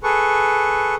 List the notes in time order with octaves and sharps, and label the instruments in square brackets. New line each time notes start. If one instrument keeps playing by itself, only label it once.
[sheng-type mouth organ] G#4 A4 B4 C#6